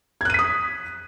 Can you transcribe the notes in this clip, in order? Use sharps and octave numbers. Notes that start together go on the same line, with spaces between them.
D#6 F#6 G#6 B6 D#7